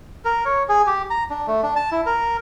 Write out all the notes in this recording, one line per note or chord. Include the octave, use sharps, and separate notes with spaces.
A#4
C#5
G#4
G4
A#5
D4
A3
D4
A5
E4
A#4